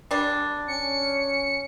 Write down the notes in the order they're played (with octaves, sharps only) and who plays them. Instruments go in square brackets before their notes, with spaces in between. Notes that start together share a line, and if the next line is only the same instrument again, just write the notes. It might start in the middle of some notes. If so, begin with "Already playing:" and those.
[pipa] G3 D4
[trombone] C#4 [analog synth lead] C#7